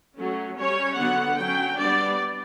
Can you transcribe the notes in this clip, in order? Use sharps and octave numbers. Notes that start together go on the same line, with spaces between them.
F#3 A3 C#4
G3 C#4 C#5
D3 F#3 B3 F#5
F#3 C#4 G5
G3 B3 D4 D5